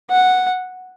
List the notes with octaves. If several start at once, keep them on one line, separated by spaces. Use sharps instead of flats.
F#5